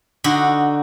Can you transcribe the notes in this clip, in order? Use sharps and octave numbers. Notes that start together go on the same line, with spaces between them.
D3 D#4 F#4